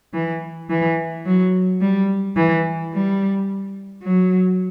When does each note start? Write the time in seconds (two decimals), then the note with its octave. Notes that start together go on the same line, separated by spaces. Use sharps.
0.14 E3
0.70 E3
1.26 F#3
1.81 G3
2.36 E3
2.93 G3
4.03 F#3